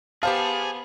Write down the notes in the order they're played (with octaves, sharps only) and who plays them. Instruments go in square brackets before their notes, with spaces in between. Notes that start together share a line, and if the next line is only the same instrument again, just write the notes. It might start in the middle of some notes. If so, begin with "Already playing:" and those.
[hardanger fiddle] B3 [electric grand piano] G4 C5 A5 [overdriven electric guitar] G#4 [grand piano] F5